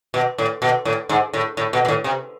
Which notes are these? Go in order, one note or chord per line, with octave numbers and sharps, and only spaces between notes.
B2
A2
B2
A2
G#2
A2
A2
B2
B2
A2
C3